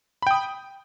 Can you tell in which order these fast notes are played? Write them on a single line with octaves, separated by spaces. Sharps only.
B5 G5 D#6